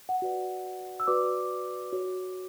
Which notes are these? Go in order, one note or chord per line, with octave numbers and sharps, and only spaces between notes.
F#5
F#4 B4 D5
E6
F#4 B4 D5 D6
F#4 C#5